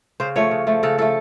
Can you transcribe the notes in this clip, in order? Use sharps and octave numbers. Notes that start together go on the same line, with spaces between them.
C#3 C5
F3 A3 C#5
C#3
F3 A3
C#3 A4
F3 A3 A4